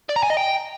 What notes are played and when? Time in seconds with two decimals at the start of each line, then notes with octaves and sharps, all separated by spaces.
0.09 D5
0.16 A#5
0.23 G#5
0.30 D#5
0.37 G5